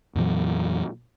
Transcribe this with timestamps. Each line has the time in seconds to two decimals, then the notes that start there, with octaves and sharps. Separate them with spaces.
0.15 F2 A#2 E3 F#3